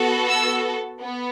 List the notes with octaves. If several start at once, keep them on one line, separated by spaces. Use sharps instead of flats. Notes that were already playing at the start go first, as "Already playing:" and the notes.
Already playing: B3 F#4 A4
E6
B3